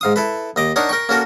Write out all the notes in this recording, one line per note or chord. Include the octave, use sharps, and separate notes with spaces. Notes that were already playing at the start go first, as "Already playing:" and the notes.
G#2 F5 D#6
E4 A4 B4
D#2 D#5 D6
D4 D#4 A#4 C#5 F#5
A#4 G5 C#6
A#3 C#4 F#4 A4 A#4